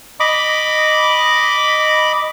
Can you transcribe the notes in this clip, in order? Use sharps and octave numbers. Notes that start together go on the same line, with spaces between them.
D#5 B5 D6